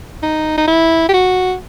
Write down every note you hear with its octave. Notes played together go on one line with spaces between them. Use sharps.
D#4
D#4
E4
G4
F#4